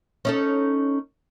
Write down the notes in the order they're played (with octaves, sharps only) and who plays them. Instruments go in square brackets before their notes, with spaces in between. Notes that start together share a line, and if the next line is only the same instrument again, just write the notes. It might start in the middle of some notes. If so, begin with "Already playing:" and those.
[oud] C#4 D#4 A4